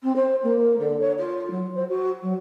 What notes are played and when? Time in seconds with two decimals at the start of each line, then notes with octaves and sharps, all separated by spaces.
0.02 C4
0.15 C5
0.42 A#3
0.78 D3
1.00 C#5
1.18 F4
1.50 F#3
1.75 C5
1.88 F#4
2.22 F#3